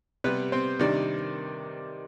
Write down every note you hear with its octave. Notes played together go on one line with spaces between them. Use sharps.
C3 G3 B3 B4
C4 C5
C3 D#3 G3 D4 D5